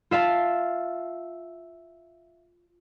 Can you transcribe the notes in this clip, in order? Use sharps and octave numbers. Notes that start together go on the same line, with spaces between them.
F4 E5 F5 A5